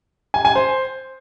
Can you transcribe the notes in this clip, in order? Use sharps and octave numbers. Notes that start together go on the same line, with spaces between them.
G#5
G#5
C5